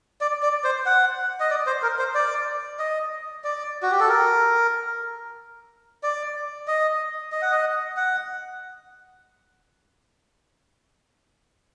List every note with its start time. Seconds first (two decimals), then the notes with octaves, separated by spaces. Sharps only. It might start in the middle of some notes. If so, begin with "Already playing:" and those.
0.21 D5
0.42 D5
0.64 C5
0.86 F#5
1.40 D#5
1.50 D5
1.67 C5
1.83 A#4
1.99 C5
2.15 D5
2.79 D#5
3.44 D5
3.82 F#4
3.91 G4
4.00 A4
4.09 A#4
6.03 D5
6.67 D#5
7.32 D#5
7.42 F#5
7.52 D#5
7.97 F#5